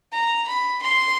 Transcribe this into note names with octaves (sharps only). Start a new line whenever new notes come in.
A#5
B5
C6